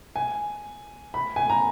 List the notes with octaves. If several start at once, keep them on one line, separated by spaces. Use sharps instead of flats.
G#5
B5
G#5
A#5